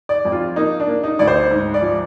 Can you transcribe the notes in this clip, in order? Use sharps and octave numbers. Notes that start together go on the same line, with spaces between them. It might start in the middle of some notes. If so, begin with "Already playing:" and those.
D5
F2
F4
A#3 D#4
D4
A#3
D#4
D2 D5
C5
G#2
D5
F3